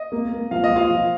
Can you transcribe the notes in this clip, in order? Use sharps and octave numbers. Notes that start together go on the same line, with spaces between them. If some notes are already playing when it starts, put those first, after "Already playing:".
Already playing: D#5
A#3
A#3
F3 F5
D#5
F3
F4 F5
F3